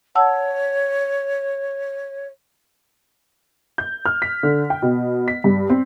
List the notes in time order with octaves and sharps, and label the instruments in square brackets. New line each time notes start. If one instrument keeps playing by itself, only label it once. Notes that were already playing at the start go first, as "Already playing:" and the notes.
[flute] C#5 [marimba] F#5 A5 E6
[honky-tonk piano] G6
F6
B6
D3
G5
B2
B6
G2
C4